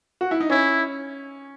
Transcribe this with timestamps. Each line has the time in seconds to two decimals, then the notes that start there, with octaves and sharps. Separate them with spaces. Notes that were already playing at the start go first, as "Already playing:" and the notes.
0.21 F#4
0.31 E4
0.40 D#4
0.50 C#4 E4